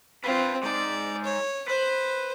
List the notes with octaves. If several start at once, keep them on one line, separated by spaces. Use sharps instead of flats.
C4 F4 B4 F5
G#3 D#4 D5
C#5
B4 C5